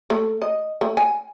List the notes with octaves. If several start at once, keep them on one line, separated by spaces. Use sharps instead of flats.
A3
D#5
A3
G#5